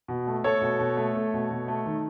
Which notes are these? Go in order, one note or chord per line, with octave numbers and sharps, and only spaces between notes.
B2
A3
A3 A4 C#5
B2
B2
A3
A3
B2
B2
A3
D#3